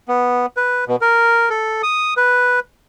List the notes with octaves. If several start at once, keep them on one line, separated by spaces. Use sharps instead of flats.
B3
B4
B2
A#4
A4
D#6
B4